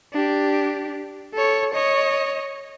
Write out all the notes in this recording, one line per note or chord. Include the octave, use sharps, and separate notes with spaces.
D4 G4
A4 C#5
C#5 D#5